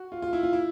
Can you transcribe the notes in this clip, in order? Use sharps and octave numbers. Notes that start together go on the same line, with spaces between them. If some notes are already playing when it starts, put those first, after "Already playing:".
Already playing: F#4
F4
F4
E4
F4
E4